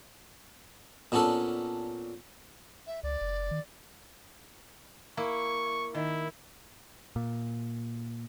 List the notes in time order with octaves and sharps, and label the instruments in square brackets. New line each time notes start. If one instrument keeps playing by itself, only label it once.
[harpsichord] A#2 B3 C#4 D4 A4
[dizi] E5
[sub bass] C#2 [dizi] D5
[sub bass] F#1
D#3
[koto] A#3 E4 [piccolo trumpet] C#6
[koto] D#3 [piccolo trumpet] E4
[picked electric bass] A#2